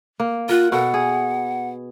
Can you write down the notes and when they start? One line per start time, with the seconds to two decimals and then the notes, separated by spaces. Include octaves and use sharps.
0.20 A#3
0.49 F4 A#4 F#5
0.72 B2 A4 F#5
0.94 G#4